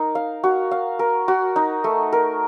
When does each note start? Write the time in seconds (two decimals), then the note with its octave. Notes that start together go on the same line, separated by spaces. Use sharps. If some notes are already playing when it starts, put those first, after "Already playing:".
Already playing: D#4 A#4
0.15 F5
0.44 F#4
0.71 F5
0.99 A#4
1.28 F#4
1.56 D#4
1.84 A3
2.12 A#4